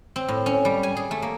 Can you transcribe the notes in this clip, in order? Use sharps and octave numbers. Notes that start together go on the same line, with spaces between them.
C4
A2
C#4
G3
G#5
G#4
A3
A#3